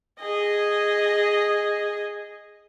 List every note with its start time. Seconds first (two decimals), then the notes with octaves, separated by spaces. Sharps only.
0.19 G#4 D#5